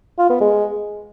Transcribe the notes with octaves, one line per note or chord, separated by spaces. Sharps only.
F4
B3
G#3